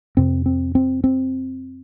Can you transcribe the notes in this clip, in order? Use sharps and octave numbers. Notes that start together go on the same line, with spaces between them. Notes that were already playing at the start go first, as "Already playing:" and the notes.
F2 C3 C4
C4
C4
C4